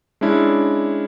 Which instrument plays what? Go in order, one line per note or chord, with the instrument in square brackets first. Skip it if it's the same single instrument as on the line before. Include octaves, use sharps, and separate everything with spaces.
[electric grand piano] G#3 C#4 D4 E4